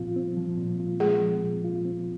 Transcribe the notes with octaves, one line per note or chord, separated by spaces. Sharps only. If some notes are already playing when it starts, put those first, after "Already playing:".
Already playing: A#2 F3 C4 F4
C4
F3
A#2
F4
G#3 C4 G#4
F3
A#2
F4
C4